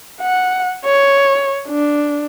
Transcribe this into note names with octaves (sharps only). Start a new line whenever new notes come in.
F#5
C#5
D4